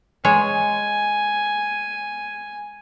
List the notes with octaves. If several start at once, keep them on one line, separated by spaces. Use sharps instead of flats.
G#3 C#5 G#5